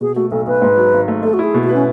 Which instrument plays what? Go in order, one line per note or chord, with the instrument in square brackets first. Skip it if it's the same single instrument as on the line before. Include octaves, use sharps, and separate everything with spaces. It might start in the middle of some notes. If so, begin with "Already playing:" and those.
[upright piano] B2 [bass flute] G#4
[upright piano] A3 [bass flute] F#4
[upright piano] B1 [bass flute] A4
[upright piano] B1 [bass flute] B4
[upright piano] G#2
F#3
G#1
A3
[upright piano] A3 [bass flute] A4
[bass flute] F#4
[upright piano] E4 [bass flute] G#4
[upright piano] B2
[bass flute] F#4
[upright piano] B4
[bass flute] C#4